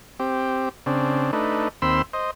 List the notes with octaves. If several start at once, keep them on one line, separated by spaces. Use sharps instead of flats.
C4 G4
C#3 C4 D4
A3 D4 D#4 B4
D#2 C4 B5 C6 E6
C5 D#5